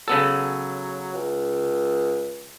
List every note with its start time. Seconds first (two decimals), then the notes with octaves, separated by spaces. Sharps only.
0.08 C#3 F#3 B3 A4
1.14 C#2